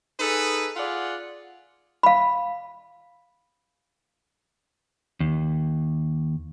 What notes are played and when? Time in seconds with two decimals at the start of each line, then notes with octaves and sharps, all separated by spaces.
0.20 D#4 G#4 A4 B4
0.76 F4 G#4 D5 F#5
2.03 F5 B5
5.20 D#2